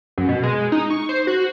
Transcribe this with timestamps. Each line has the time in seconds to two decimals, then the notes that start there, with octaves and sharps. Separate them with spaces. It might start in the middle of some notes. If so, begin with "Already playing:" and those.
0.18 F#2
0.29 B2
0.43 G#3
0.72 D#4
0.90 C#6
1.09 C5
1.27 F#4